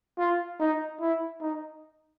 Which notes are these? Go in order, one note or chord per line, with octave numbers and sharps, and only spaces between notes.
F4
D#4
E4
D#4